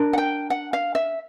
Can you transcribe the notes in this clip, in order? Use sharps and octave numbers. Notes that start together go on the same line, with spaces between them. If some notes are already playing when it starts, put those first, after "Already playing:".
Already playing: D4 A#4
F#5
G5
F#5
F5
E5